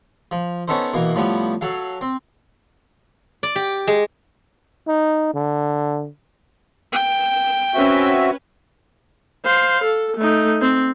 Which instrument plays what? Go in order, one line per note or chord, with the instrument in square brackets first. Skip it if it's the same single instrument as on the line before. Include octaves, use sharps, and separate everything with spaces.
[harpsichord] F3
B3 C#4 D#4 A4 C5
B2 E3 A#3
A2 F3 G3 B3
F#3 A4 F5
C4
[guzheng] D5
G4
G#3
[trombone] D#4
D3
[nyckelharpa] G5
[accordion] C4 F#4 E5 [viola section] C#4 B4
[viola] C5 F5
A4
A3 D#4
C4